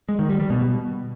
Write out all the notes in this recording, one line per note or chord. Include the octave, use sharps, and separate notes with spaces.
G#3
D#3
G3
G3
B2